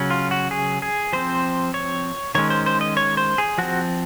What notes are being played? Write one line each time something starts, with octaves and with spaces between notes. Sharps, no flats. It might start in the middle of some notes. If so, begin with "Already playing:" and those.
Already playing: C#3 F#3 C#4
F4
F#4
G#4
G#4
F3 C4 C5
C#5
D#3 G#3 C#4 C#5
C5
C5
D#5
C#5
C5
G#4
F3 C4 F#4